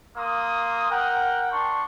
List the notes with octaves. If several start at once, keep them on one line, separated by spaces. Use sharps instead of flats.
A#3 C6 D#6
A#4 F#5 G5
D4 C6 C#6